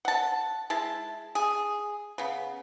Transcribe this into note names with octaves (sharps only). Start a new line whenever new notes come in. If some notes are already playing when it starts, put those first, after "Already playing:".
F#5 A5
G#3 E4 A5
G#4
C#3 B3